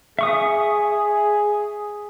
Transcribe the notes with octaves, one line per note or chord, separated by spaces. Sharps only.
G#4 E5 C#6 D#6